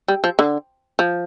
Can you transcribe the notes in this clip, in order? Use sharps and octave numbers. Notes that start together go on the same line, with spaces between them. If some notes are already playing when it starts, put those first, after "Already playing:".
G3
F3
D3
F3